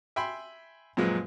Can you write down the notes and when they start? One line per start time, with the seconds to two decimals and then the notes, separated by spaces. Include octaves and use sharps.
0.16 E5 G5 G#5 B5 C6
0.97 F#2 A#2 F3 G#3 B4